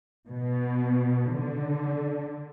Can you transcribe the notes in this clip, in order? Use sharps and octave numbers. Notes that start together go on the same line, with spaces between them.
B2
D3